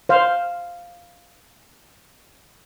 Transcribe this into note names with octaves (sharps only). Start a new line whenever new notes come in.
C5 F5